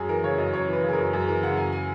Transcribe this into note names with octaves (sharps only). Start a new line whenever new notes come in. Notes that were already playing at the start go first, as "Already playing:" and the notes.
Already playing: F#2 G#4
E3 A#4
C#3 C#5
F#2 D#5
F#2 C#5
E3
B4
C#3
G#4
A#4
F#2
F#2 G#4
E3 A#4
C#3 F#5
F#2 G#5
G#5